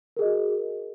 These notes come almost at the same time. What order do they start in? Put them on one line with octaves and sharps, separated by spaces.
A#4 G#4 D#5 F#4